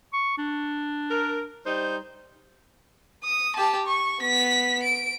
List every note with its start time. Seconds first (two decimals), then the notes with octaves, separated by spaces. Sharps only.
0.13 C#6
0.38 D4
1.11 A#4
1.65 G3 D#4 C5
3.24 D#6
3.56 G4 A5
3.87 C#6
4.22 B3 B6
4.83 D7